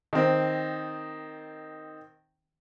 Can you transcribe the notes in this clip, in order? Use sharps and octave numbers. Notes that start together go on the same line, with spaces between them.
D#3 C4